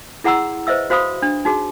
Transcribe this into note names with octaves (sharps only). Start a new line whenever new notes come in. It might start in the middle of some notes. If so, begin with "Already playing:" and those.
E4 G#4 F#5 A#5 C6 E6
B4 C5 D#5 E5 E6
F#4 C5 F5 B5 D#6
D4
D#4 F#4 G#4